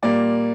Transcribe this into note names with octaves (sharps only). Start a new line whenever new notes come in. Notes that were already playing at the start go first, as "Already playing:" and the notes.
A#2 G3 A#3 D5